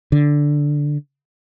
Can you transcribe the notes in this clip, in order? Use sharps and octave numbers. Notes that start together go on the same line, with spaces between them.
D3